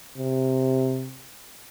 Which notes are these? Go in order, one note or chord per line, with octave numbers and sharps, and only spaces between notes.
C3